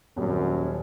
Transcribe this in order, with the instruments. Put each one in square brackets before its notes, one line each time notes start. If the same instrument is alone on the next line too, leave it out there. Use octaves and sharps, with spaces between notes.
[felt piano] D#1 [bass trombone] F#2